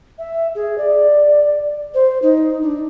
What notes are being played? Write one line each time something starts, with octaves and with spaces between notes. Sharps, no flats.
E5
G#4
D5
C5
D#4
D4